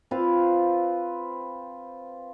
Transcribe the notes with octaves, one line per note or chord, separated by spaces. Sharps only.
C4 F4 B4 F5